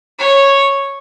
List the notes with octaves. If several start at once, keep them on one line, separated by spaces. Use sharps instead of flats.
C#5